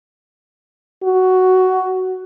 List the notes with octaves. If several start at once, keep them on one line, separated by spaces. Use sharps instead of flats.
F#4